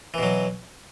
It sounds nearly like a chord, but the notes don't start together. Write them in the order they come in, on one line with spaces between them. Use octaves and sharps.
E3 B2 F#3